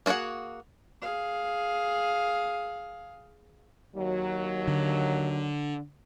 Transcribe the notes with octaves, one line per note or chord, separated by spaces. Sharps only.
A#3 F4 F#4 G#4 F#5
G#4 F5
D#2 F#3
D3